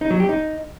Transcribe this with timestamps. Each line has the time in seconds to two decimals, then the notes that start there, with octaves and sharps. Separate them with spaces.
0.01 D#4
0.11 F#3
0.20 G4
0.29 D#4